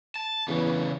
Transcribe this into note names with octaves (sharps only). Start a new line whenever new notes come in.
A5
E2 C#3 E3